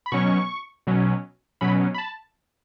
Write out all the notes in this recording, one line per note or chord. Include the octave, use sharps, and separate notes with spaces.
B5
B2 F#3 C#4 C#6
B2 F#3 C#4
B2 F#3 C#4 B5
B5
A5